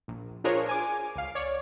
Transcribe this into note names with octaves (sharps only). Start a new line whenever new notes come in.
A#1
D4 F4 G#4 A#4 C5 C#5
G#5 D6
C#2 F5
C#5 D5